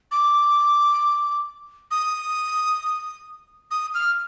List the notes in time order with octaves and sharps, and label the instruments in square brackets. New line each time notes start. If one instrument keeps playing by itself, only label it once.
[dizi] D6
D#6
D#6
F6